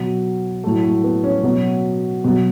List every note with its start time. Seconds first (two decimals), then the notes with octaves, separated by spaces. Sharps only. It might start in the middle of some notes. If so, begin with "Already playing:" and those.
Already playing: B2 F#3
0.64 A2 F#3 A3
0.84 A3
1.04 B3
1.24 C#4
1.43 B2 F#3
2.24 B2 F#3